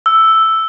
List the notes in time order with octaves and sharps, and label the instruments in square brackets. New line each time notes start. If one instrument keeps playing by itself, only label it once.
[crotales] E6